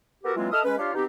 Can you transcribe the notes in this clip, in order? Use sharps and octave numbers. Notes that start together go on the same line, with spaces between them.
B3 F#4 G4 A4 A#4
E3 F#3 G#3 A#3 C4 F4
A4 D#5 E5 A5 D#6 F6
G#3 C#4 B4
D4 F4 G4 C#5 F5
B2 C4 D#4 G4